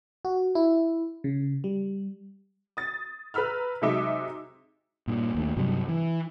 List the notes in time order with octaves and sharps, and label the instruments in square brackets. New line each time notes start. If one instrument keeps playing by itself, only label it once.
[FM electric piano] F#4
E4
C#3
G3
[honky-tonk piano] D#6 A6
B4 A#5 B5 E6 F6
C3 F#3 G#3 D#4 E5 D6
[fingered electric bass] G2 A#2
D#2 A3
G2 C3 F#3 G3
E3